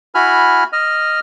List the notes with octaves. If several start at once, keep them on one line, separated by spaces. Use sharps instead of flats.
E4 F#4 G#5 B5 F6
D#5 F6